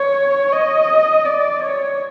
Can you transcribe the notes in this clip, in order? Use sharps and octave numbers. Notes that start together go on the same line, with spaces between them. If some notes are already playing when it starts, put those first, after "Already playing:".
Already playing: C#5
D#5
D5
C#5